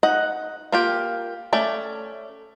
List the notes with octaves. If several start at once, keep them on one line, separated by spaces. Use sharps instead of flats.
D#4 D#5 F#5
A#3 F4 G4
A3 C#4 D5